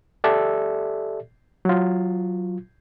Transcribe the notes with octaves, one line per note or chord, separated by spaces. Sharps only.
G4 A4 D5 E5
F#3 F4